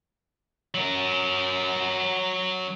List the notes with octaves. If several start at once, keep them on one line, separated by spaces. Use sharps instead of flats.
F#3 A#4